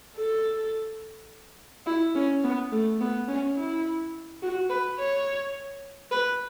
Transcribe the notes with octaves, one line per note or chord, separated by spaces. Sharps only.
A4
E4
C#4
B3
A3
B3
C#4
E4
F#4
B4
C#5
B4